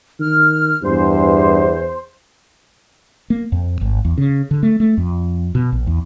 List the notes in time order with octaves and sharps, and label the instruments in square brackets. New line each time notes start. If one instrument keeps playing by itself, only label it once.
[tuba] D#3 [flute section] F6
[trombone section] E2 [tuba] G2 [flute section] C5
[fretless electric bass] A#3
F2
G#1
E2
C#3
D3
A3
A3
F2
B2
A#1
E2